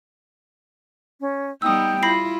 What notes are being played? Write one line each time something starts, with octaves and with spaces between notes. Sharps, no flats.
C#4
G3 B3 D#4 G5 D#6 E6 G6
E4 F4 B5 A#6 C7